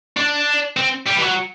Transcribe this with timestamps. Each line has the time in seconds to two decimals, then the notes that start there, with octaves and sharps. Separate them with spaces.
0.17 D4
0.77 C4
1.07 G3
1.17 E3
1.22 F#3